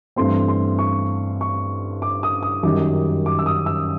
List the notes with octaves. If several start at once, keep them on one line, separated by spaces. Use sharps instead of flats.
G2 E3 A3 C4 C6
C6
C#6
C#6
D6
D#6
D#6
F#2 D#3 G3 D6
D6
E6
D#6
E6